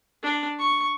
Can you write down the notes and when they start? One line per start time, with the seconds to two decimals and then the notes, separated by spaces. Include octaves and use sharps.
0.23 D4
0.59 C#6